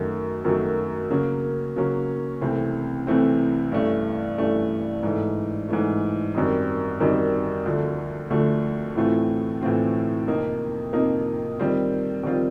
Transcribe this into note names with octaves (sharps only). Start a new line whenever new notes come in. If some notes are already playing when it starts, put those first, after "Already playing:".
Already playing: F#2 D#3 F#3 A3
F#2 D#3 F#3 A3
C#3 F#3 A#3 C#4
C#3 F#3 A#3 C#4
C2 C3 E3 A3 C4
C2 C3 E3 A3 C4
G2 E3 A3 C#4
G2 E3 A3 C#4
G#2 E3 A3
G#2 E3 A3
F#2 D#3 G3 C4 D#4
F#2 D#3 G3 C4 D#4
D2 D3 F3 A3
D2 D3 F3 A3
A2 E3 A3 C4 F4
A2 E3 A3 C4 F4
F2 C3 F3 A#3 D#4
F2 C3 F3 A#3 D#4
D#3 G3 C4 F4
D#3 G3 C4 F4